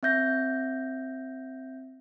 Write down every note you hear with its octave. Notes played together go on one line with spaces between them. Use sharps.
C4 E5 G6 A#6